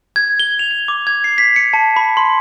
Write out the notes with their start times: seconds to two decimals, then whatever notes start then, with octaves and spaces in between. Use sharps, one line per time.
0.16 G#6
0.39 G7
0.59 F7
0.71 F7
0.88 D6
1.07 G#6
1.24 C7
1.38 B6
1.56 C#7
1.73 A5
1.96 B5
2.17 C6